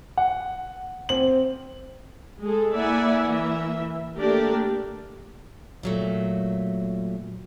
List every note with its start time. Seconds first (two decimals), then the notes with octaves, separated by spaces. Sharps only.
0.18 F#5
1.09 C4 F#7
2.42 G#3 G#4 A4
2.74 A#3 E4 D5 E5 F#5 G#5
3.27 E3 A#3 E5
4.18 A3 A#3 D4 G4 A#4 D5
5.83 A#2 F#3 A3